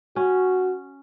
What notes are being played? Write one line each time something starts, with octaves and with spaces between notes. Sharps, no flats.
C#4 F#4